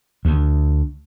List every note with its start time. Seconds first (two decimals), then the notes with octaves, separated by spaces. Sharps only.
0.25 D2